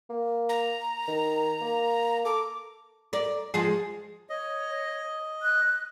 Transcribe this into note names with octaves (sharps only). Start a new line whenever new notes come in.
A#3
A#5
D#3
A#3
A4 D6
A#4 D5
F3 G#3 G#4
C#5 D#5
F#6